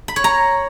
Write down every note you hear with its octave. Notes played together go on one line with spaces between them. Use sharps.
B5
C#5
A#5